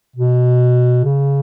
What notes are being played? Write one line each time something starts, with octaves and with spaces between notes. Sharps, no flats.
B2
C#3